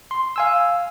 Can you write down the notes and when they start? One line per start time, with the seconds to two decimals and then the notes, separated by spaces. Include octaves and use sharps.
0.11 C6
0.36 F5 G#5 E6